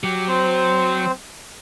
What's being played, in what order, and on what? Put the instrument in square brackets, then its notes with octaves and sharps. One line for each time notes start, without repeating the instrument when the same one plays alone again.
[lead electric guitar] F#3 [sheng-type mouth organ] G4
[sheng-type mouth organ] C4 C5